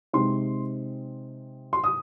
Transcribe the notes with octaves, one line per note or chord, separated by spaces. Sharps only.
C3 G#3 C4 D#4 C6
C6
D#6